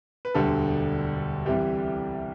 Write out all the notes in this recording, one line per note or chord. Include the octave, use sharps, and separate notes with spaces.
B4
E1 D2 D3 G3 A4
C2 C3 E3 G3 G4